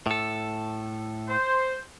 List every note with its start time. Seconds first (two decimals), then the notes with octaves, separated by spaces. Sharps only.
0.06 A2 A4
1.28 C5